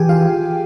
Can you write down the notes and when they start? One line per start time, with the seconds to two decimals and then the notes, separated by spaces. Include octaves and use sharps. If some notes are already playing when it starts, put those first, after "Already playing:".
Already playing: E3 G4 G#4 G5 G#5
0.09 F4 F5